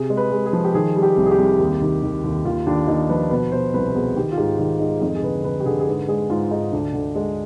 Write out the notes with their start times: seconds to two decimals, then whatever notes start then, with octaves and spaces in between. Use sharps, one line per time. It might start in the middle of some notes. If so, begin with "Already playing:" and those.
Already playing: C3 G#4
0.10 G#3
0.17 B4
0.32 G#3
0.46 G#4
0.53 F3
0.64 G4
0.74 D#3 G#4
0.96 G3
1.03 G4
1.17 C2
1.26 G#4
1.31 G4
1.38 C2
1.59 D#2
1.82 D#3
2.03 D#3
2.24 D#2
2.45 D#2 F4
2.67 D#2 D4
2.88 D#2 D#4
3.09 F3 B4
3.30 B2 B4
3.52 B2 C5
3.74 C2 B4
3.95 B2 G#4
4.16 D#3 G4
4.32 F4
4.37 G#2 G4
4.59 D#3 F4
4.80 G#3 D#4
5.01 F2 D#4
5.15 G#4
5.23 D3 B4
5.44 D3 B4
5.60 G4
5.66 D3 G#4
5.80 G#4
5.87 G#2 B4
6.08 G#3 G#4
6.30 G#2 F4
6.51 G#2 D#4
6.72 D2 D4
6.94 D3
7.15 G#3